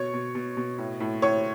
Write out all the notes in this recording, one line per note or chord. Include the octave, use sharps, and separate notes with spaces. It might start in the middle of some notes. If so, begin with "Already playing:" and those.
Already playing: B2 C#5 C#6
B2
B2
B2
A2
A2
A2 C#5 C#6